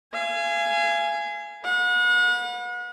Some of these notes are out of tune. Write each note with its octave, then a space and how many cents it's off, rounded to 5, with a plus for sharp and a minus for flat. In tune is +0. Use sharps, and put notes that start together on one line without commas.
F5 -40 G#5 +0
B4 -25 F#5 -40